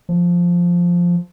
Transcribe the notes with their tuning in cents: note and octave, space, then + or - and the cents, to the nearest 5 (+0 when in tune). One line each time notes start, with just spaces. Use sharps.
F3 +0